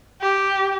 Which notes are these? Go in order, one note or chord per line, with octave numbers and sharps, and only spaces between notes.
G4